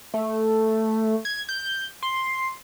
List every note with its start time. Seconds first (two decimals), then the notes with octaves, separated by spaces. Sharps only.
0.14 A3
1.25 G#6
1.49 G6
2.03 C6